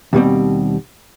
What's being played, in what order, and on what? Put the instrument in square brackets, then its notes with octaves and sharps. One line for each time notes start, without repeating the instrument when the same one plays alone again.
[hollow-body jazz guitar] D#2 B2 G3 C4